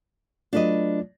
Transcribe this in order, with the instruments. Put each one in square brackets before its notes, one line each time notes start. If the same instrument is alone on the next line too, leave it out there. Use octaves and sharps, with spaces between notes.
[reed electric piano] F#3 A3 F4 [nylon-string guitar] D4 B4 D#5